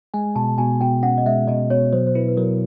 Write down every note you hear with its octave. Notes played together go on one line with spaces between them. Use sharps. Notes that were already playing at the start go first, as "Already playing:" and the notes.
G#3 G#5
B2 A5
B2 G#5
B2 G5
C#4 F#5
D#5
G#3 E5
B2 D#5
B2 C#5
F#3 C5
C5
E4 B4
B4
F#3 A#4